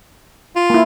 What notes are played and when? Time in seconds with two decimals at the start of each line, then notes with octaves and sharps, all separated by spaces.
0.56 F4
0.70 A#3 E4